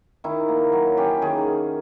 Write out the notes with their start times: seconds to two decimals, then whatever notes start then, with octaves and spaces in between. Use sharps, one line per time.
0.24 D#3 E4
0.49 A#3
0.73 F#3
0.97 C#4 G4
1.22 D#3 G#4